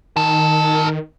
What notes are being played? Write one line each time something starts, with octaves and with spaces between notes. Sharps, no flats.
D#3 A#4 A5